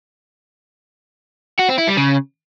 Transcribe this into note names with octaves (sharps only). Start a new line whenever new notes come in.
F#4
C4
E4
G3
C#3